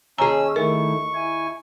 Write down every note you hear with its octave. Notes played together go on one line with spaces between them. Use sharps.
D#2 C#4 G#4 A#5 E6
D#3 A3 E4 A#4 C#6
E4 G#5